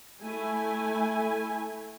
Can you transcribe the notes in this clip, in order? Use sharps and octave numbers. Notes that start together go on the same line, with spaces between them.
A3 E4 G#5